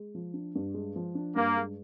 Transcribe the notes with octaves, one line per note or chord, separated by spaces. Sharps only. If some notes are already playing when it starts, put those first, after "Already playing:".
Already playing: G#3
F3
D4
G2
G#3
F3
D4
G2 A#3
G#3